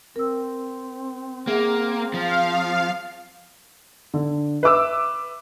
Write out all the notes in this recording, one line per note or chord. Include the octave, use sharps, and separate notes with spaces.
C4 A#4 E6
A#3 G#4 E5 F#5
F3 F5
D3
B4 E5 D6 E6